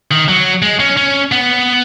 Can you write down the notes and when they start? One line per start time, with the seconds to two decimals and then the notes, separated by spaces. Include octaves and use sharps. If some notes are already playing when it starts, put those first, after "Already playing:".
0.11 D#3
0.29 F#3
0.62 G#3
0.80 C#4
0.97 C#4
1.32 B3